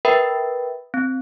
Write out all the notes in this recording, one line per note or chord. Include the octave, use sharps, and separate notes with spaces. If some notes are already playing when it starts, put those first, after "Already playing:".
A#4 B4 E5 G5 B5
C4